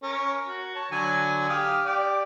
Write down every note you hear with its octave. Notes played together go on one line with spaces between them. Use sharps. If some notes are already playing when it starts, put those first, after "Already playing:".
C#4 A#4
F#4
C#5 A5
D3 F#3 G#5
G4 F5 D#6
G4 D5